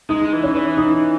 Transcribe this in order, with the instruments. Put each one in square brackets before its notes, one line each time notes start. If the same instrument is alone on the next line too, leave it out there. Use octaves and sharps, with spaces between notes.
[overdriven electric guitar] G#3 [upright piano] D#4
[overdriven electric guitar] E3
[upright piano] C#4
[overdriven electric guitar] E3
[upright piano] D#4